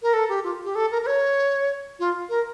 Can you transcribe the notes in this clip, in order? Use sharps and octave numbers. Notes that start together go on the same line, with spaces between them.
A#4
A4
G4
F4
G4
A4
A#4
A#4
C#5
F4
A#4